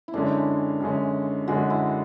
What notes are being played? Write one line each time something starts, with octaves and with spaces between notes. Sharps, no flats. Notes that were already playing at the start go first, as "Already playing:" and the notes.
E4
F#2 D3 G#3 C#4 D4
F#2 D3 G#3 C#4
F#2 D3 G#3 C#4 F#4
E4